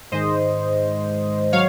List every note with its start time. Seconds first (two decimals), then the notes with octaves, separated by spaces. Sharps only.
0.12 G#2 D#3 G#3 C5 D#5
1.53 F#3 C#5 F5